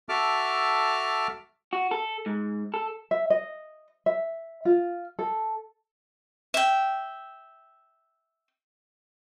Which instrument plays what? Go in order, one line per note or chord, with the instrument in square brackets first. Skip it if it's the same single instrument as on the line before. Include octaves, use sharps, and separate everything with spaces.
[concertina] F#4 A4 E5 A5 D6 F6
[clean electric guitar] F#4
A4
G#2
A4
[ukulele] E5
D#5
E5
F4
A4
[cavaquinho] E5 G5